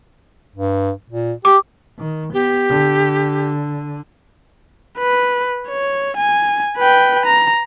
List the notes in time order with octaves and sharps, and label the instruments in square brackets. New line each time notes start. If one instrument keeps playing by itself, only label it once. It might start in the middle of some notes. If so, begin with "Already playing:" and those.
[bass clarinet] G2
A#2
[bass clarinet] G4 [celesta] D6
[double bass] D#3
[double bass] B3 [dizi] G4
[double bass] D3
[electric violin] B4
C#5
G#5
B4 G5
A#5